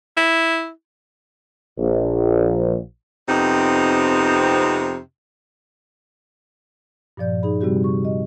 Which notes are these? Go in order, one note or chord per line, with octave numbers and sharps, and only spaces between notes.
E4
A#1
F2 C3 B3 C4 D#4
G2 A#2 F3 D5 G6
D#4 G#4 B5
C3 G3 C4 F#4 G4
C#6
D#5